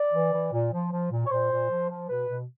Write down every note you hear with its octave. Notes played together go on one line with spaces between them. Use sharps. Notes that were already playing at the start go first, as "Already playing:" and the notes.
Already playing: D5
E3
E3
A#2
F3
F3
A#2
C#5
A#2 C5
A#2
F3
F3
B2 B4
B2